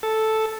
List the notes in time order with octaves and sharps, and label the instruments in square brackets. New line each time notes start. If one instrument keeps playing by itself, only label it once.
[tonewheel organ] A4